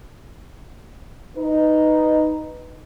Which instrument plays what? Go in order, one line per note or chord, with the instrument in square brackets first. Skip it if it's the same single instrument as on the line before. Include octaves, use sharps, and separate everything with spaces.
[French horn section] D#4 B4